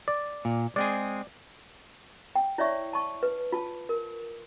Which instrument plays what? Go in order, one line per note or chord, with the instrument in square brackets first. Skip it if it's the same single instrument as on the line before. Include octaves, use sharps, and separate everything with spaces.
[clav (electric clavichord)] D5
[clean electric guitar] A#2
[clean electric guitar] G#3 C4 G#4 [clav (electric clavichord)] D5
[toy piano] G5
E4 C#5 D5 E5 C#6
A5 C#6
B4
F4 A5
A#4